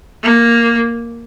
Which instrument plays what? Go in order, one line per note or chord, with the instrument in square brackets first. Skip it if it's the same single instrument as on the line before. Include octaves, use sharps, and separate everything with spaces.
[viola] A#3